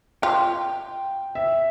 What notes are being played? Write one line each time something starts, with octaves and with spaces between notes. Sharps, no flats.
F4 G5
E5